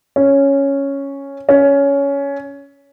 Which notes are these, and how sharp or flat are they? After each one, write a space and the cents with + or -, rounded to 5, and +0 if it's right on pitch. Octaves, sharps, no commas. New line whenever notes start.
C#4 +0
C#4 +15